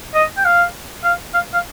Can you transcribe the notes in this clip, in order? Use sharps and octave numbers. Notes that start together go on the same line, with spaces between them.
D#5
G5
F5
F5
F5
F5